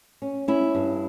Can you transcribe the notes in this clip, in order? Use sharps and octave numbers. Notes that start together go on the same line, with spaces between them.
C#4
C#4 E4
G2